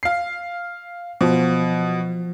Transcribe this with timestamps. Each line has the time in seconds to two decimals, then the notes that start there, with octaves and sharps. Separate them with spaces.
0.03 F5 C7
1.21 B2 F3